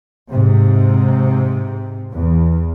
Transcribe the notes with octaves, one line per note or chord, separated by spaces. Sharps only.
G#2 C3
E2